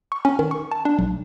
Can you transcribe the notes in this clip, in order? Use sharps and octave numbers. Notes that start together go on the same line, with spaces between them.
C#6
C#4
D#3
C#6
A5
D4
B1